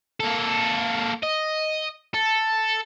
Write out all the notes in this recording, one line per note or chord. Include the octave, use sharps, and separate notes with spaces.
A#3 A4
D#5
A4